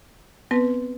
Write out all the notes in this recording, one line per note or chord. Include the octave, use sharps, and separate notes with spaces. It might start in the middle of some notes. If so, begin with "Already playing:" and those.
B3 C4 B4